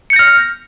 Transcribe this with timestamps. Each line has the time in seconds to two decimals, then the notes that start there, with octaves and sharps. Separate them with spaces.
0.10 C#7
0.13 G6
0.16 A#6
0.19 F6